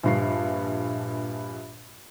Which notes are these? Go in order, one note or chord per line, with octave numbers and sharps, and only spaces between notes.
A#1 G2 C7